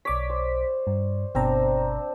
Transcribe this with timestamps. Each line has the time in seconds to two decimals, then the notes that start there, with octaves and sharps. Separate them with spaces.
0.05 B1 C#5 D5 D6 B6
0.30 C5
0.87 G2
1.35 G1 B2 C4 D4 C5 A#5